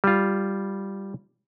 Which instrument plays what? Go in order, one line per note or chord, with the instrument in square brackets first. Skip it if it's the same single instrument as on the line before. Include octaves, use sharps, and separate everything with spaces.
[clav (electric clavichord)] G3 F4